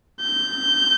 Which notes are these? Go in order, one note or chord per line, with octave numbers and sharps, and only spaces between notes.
G6